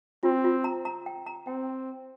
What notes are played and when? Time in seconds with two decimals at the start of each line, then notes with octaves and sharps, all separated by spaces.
0.23 C4 F4
0.44 F4
0.64 A#5
0.85 A#5
1.06 G5
1.26 A#5
1.47 C4 G5